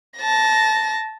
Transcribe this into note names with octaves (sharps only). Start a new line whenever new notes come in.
A5 A#6